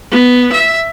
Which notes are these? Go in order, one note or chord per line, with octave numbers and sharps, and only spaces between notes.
B3
E5